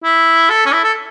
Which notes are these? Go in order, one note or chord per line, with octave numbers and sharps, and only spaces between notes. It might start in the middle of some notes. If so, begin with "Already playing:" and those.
E4
A4
C#4
E4
A4